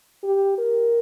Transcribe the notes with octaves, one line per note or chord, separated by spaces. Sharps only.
G4
A#4